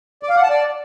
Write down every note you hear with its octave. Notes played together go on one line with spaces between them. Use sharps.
D5
F5
F#5
A5
D5